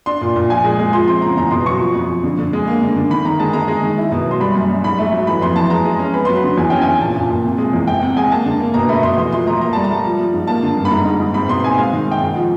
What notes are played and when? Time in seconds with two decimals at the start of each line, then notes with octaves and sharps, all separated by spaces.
0.06 D4 C6
0.21 A#2
0.36 A#2
0.50 F3 G#5
0.64 G#3
0.80 G#3
0.93 F3 C6
1.08 C4 C6
1.22 C#3 A#5
1.37 E2 A#5
1.51 B2 C6
1.66 F#3 C#6
1.80 F3
1.95 F2
2.09 F2
2.24 D3
2.39 D3
2.53 G#3
2.68 A#3
2.82 D3
2.96 D3
3.10 D#3 B5
3.25 D#3 A#5
3.40 G#3 A5
3.53 G#3 A#5
3.68 G#3
3.83 D#3
3.98 E4
4.12 B2
4.27 F#3 C6
4.41 G3 B5
4.55 F#2
4.69 F#2
4.84 G#2 B5
4.99 A3
5.12 F#3
5.27 E3 B5
5.42 F2 C6
5.56 E3 A5
5.70 G#3 A#5
5.85 G#3
5.99 C#4
6.14 B3 B5
6.25 F#3 C6
6.37 B5
6.44 D3
6.57 E2 G#5
6.70 C#4 G5
6.82 G#5
6.87 E2
7.01 A#2 A5
7.16 A#2
7.30 A#2
7.45 C3
7.58 G#3
7.73 E2
7.87 C3 G5
8.03 C3 F#5
8.16 G#3 G#5
8.31 A#3 A5
8.46 D3
8.60 A#3
8.74 B2 A#5
8.89 A3 B5
9.03 B2 C6
9.18 E2 C6
9.32 F3 C6
9.46 A3 A#5
9.61 A#3 A#5
9.73 G3 A5
9.84 A#5
9.90 G3
10.05 F3
10.19 F3
10.34 G#2
10.47 A#3 A5
10.63 D3
10.77 G2
10.85 B5
10.91 G#2 A#5
11.06 G#2
11.20 G#2
11.34 C4 B5
11.49 B2 C6
11.64 C4 G#5
11.78 G#3 F5
11.93 D#3
12.08 D#3 G5
12.22 G#2 F#5
12.36 F3